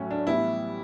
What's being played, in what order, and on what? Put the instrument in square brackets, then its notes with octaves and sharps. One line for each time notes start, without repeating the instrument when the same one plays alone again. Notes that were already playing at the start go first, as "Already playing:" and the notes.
Already playing: [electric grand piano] A2 F#3 A3 C#4
[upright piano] D4
[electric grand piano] A2 E3 G3 B3 [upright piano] E4